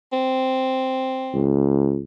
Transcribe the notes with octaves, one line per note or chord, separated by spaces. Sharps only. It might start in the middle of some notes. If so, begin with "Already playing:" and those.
C4
C#2